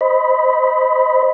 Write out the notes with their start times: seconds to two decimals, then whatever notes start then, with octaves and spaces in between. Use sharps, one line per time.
0.01 C5 D#5 B5